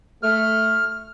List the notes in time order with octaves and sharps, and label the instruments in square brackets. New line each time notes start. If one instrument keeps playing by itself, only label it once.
[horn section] A3 [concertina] F6